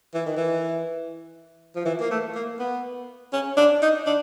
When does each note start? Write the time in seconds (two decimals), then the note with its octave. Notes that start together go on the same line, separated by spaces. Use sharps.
0.14 E3
0.26 D#3
0.37 E3
1.76 F3
1.85 E3
2.00 A#3
2.11 A3
2.35 A#3
2.59 B3
3.33 C#4
3.57 D4
3.82 D#4
4.06 D4